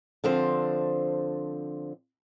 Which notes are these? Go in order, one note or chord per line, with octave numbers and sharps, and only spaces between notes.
D3 F3 C4 C5